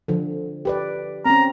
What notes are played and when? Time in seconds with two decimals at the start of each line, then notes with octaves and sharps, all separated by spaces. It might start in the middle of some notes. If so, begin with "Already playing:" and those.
0.08 D3 F3
0.65 G4 B4 D5
1.25 C4 C#4 A#5